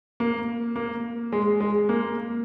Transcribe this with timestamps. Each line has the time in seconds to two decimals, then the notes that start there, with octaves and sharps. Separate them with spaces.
0.20 A#3
0.76 A#3
1.32 G#3
1.60 G#3
1.89 A#3